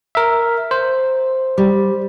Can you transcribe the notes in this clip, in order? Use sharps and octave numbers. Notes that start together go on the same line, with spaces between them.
A#4 E5
C5
G3